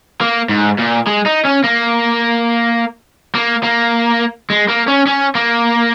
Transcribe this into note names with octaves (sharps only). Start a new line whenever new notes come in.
A#3
G#2
A#2
G#3
D#4
C#4
A#3
A#3
A#3
G#3
A#3
C#4
C#4
A#3